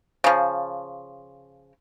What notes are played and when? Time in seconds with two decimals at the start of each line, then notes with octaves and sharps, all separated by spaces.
0.24 C#3 F3